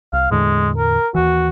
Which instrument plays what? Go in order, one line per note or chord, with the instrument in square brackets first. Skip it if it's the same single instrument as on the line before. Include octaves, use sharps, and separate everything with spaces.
[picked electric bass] C2 [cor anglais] F5
[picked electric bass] E2 A2 D3 [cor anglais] G#3
[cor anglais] A#4
[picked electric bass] D#2 E3 [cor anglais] F#4